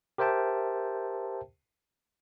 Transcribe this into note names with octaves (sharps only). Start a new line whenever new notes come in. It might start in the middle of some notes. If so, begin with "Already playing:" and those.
G4 A#4 C5 E5 G5 A5